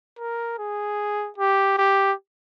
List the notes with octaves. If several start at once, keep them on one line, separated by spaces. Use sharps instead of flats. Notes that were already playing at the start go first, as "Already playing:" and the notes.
A#4
G#4
G4
G4